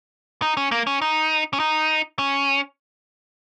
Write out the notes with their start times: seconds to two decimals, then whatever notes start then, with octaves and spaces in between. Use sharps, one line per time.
0.42 D#4
0.57 C#4
0.71 A#3
0.87 C#4
1.02 D#4
1.53 C#4
1.60 D#4
2.19 C#4